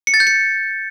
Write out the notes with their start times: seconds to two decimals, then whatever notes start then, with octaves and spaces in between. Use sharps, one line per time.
0.07 C#7
0.14 A6
0.20 G6
0.27 C#7